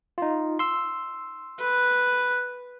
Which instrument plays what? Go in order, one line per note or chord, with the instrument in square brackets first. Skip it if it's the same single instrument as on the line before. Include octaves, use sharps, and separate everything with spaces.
[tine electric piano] D#4 F4
C6 E6
[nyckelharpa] B4